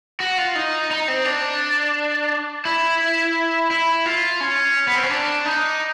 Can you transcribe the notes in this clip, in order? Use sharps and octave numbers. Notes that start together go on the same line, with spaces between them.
F#4
F4
D#4
D#4
C4
D4
E4
E4
F4
C#4
B3
C4
C#4
D4
D#4